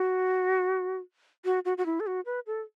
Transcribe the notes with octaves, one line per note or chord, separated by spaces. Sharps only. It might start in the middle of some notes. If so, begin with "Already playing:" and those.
Already playing: F#4
F#4
F#4
F#4
E4
A4
F#4
B4
A4